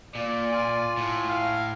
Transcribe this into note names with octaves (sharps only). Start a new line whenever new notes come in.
A#2 D5
F4 G#5
A2
F5